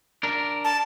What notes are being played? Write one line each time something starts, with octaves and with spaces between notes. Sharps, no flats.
D4 A#4
A5